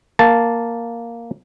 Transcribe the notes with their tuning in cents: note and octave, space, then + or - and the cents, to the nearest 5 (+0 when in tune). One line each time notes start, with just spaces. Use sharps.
A#3 +0 A5 +0